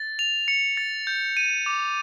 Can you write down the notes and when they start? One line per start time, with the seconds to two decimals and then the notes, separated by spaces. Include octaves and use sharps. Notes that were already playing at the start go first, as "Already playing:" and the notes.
Already playing: A6
0.19 F7
0.48 C#7
0.77 A6
1.07 G6
1.37 D#7
1.66 D6